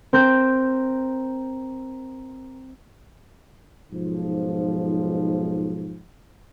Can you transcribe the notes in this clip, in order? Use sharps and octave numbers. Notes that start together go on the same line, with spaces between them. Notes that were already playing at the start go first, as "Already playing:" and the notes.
C4 A#4 C6 G6
B1 G#2 F3